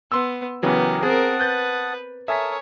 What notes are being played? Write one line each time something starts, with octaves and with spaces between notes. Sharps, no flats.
B3 C6 E6
C#3 E3 F#3 B3 G4 G#4 A#4
C4 G#4 A#4 F#5 A5 D#6
B4 F#6 G6 A6
A4 A#4 C#5 E5 G#5 D#6 B6